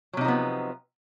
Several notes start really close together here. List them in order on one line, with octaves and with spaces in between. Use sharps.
F#3 C3 D#4 F3 B3